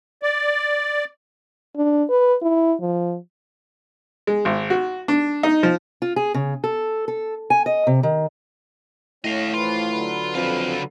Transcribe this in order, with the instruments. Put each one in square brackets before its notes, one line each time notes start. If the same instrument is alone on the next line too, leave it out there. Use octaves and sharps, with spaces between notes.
[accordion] D5
[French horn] D4
B4
E4
F3
[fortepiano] G#3
G#1
F#4
D4
D#4
F3
[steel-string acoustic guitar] F4
G#4
C#3
A4
A4
G#5
D#5
C3
D#3
[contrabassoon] A2 [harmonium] C#4 [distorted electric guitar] D#5 F5
[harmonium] E3 F3 B4 [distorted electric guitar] F4
[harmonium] D3 F#3 B4
[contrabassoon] F2 [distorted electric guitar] C#3 F4